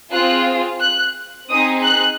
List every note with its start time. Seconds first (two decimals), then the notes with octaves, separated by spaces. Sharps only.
0.12 C4 F4 G#4 F#6
0.81 F#6
1.49 C4 D#4 G#4 D#6
1.83 F#6